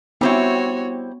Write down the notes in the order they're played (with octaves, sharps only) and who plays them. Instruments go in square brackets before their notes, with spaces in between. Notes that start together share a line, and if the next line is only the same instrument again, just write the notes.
[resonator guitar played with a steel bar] G3 C4 E4 [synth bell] B3 [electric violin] F#4 C#5